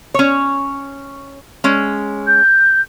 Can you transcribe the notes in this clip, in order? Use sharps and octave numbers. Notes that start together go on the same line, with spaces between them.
C#4 C#5
G#3 C#4
G6